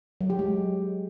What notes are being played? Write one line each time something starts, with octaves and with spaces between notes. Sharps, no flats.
F#3
G4
G#3